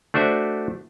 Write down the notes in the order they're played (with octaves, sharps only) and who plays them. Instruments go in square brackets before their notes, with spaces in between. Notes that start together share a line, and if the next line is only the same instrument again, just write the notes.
[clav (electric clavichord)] A3 D4 F#4 C5 E5